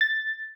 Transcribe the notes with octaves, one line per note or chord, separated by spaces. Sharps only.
A6